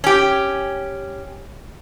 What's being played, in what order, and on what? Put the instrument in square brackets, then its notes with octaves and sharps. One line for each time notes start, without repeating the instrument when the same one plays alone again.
[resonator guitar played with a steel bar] C#4 G4